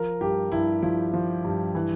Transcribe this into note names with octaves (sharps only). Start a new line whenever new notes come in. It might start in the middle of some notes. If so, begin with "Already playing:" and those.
Already playing: F3 A#4
G2 G4
G2 E4
F3 E4
F3
G2
E3